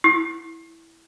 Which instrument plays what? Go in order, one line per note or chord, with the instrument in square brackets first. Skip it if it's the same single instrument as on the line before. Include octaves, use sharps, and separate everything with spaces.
[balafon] E4